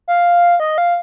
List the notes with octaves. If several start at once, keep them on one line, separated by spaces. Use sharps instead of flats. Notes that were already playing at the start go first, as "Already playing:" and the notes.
F5
D#5
F5